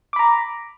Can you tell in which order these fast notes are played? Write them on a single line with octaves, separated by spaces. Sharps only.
D6 B5 A#5